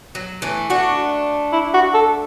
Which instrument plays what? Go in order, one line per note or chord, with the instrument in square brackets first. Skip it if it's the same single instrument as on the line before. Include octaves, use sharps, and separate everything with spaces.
[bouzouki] F#3
E3 A3
[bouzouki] A3 D4 [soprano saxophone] F#4
[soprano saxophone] E4
F#4
A4